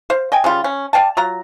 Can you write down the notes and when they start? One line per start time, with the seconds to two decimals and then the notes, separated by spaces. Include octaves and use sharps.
0.10 C5 F5
0.32 D#5 G5 G#5
0.44 C#3 G3 F4
0.64 C#4
0.93 D5 F5 G5 A5
1.17 F#3 F4 A#5